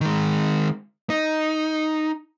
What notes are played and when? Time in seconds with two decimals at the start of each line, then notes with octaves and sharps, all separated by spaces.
0.01 D#3 G#3
1.10 D#4